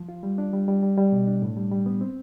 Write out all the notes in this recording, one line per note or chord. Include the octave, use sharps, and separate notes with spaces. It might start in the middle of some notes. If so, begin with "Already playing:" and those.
Already playing: F3
F4
G3
D4
G3
G3
G3
G3
B2
D4
A2
G3
G3
B3
C4